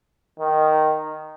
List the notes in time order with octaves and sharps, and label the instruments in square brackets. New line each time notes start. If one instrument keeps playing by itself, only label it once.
[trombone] D#3